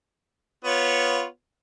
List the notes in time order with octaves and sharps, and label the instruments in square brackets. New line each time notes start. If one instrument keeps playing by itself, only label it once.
[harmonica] B3 F4 C#5